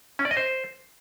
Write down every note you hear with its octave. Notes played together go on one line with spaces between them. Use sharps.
C#4
D5
D#5
C5